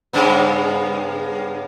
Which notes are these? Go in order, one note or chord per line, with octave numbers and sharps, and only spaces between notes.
G2 C#3 B3